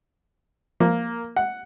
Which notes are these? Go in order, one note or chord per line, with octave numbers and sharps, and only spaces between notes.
F3 A#3
F#5